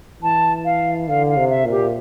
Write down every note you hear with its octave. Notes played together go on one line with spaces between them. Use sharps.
E3 A5
F5
D3 F5
F5
C3
E5
A#2
G4